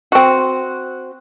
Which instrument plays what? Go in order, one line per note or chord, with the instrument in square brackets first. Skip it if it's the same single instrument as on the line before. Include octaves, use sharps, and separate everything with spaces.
[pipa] C4 F#4